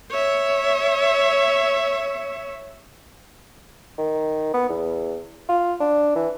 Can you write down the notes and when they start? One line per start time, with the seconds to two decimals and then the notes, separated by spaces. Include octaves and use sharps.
0.10 C#5 E5
3.98 D#3
4.54 B3
4.69 E2
5.49 F4
5.80 D4
6.16 E3